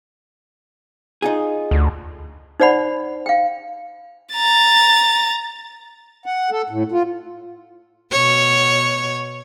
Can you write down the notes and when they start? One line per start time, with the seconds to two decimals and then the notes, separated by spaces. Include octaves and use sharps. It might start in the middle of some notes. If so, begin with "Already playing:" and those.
1.22 D#4 F4 G#4
1.71 D2
2.60 D#4 C5 D5 F#5 B5
3.26 F5 G5
4.34 A#5 A6
6.26 F#5
6.51 A4
6.70 A2
6.92 F4
8.11 B2 C#5